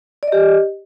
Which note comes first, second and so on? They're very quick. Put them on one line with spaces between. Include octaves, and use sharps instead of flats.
D5 D#5 G4